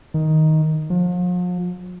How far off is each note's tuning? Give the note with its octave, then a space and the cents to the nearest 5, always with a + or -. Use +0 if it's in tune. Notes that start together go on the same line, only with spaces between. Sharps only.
D#3 +10
F3 +40